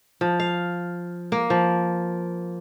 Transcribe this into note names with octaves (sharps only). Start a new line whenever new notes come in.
F3
F5
A#3
F3